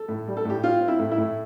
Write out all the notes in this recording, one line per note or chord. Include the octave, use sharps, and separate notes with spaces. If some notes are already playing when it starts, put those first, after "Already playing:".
Already playing: A4
A2
G3
A4
A2 G4
C4 F4
C4
E4
A2
E4
A2